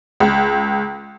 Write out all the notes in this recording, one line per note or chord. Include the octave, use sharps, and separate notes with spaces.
C#2